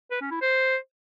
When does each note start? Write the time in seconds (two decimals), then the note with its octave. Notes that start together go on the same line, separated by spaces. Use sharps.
0.11 B4
0.21 C#4
0.31 E4
0.41 C5